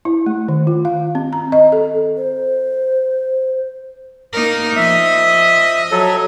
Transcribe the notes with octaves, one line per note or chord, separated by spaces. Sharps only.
E4
A3
D#3
F4
F5
C4
A#5
D#5
A4
C5
A#3 D#4 A#4
F3 D#5 E5
F#3 A4